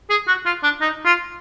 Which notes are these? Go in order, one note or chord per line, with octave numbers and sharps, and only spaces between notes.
G#4
F#4
F4
D4
D#4
F4